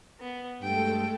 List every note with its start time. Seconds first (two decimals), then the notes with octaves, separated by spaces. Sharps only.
0.20 B3
0.62 G2 G#3 A3 A4 G5